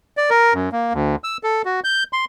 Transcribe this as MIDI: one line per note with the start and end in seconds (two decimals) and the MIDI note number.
0.17 0.30 74
0.30 0.53 70
0.54 0.69 42
0.72 0.93 58
0.93 1.16 38
1.24 1.37 88
1.43 1.62 69
1.65 1.80 66
1.84 2.04 91
2.13 2.25 84